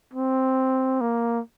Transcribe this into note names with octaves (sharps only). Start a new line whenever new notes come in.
C4
A#3